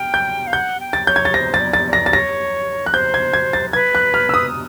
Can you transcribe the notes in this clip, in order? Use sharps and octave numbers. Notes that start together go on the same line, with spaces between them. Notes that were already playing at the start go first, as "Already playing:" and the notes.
Already playing: G5 F6
G6
F5
F#5 G6
G5
A6
C#5 G6
G#6
A6
C5 A#6
A6
D5
A6
D5
A#6
A6
C#5 A#6
F#6
C5 G6
G#6
G#6
A6
B4 G#6
F#6
F6
E6
D#6